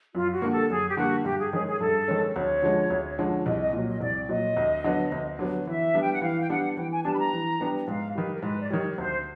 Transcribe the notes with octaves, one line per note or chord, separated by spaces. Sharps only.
F#2 F4
F#4
D3 G3 A#3
A4
F#2 G#4
G4
D3 G3 A#3 F#4
G2 G4
G#4
D#3 G#3 C#4 G#4
G#4
G2 A4
D#3 G#3 C#4
D2 C#5
D3 F3 G#3 C#4
D2
D3 F3 G#3 C#4
C2 D#5
D#5
A#2 F#3
D#5
C2 D5
A#2 F#3 D#5
D2
D3 F#3 B3
D2
D3 F#3 B3
E3 E5
G3 B3 D4
G5
F#5
E3 F5
G5
G3 B3 D4 F#5
E3 G5
G#5
G3 B3 D4 G4 A5
B5
A#5
E3
G3 B3 D4 G4
G#2 F5
D#3 G3 B4
A#4
G#2 B4
D5
D#3 G3 C#5
D2 C5